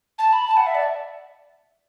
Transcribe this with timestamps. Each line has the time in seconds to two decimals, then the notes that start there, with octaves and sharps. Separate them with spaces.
0.18 A5
0.33 B5
0.47 A5
0.57 F#5
0.66 E5
0.75 D5